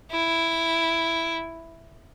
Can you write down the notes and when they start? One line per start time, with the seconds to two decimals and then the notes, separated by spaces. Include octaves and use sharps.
0.12 E4